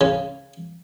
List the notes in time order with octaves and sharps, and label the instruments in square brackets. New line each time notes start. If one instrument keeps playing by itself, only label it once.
[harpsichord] C#3